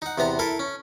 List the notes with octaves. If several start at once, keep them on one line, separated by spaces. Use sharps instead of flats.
D#4 F#5
E2 C3 B3 A#5
E4 A4 A#4
C#4